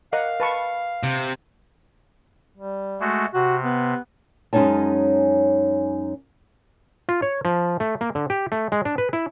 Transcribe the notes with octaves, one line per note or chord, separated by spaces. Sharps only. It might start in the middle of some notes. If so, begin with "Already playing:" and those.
A#4 D#5 F5 F#5
B4 A5 C#6
C3
G3
G#3 A3 F#4
C3 F#4
B3
F#2 G#3 C#4 D#4 C#5 A5
F4
C#5
F3
A3
A#3
D3
G4
A3
G#3
D4
B4
E4